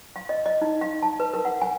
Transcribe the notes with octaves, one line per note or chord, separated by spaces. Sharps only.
F5
D#5
D#5
D#4
F5
A5
B4
A#4
F#5
G#5